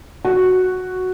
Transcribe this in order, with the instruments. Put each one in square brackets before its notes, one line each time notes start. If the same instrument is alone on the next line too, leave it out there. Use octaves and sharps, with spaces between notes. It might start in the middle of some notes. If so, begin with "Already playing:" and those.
[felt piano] F#4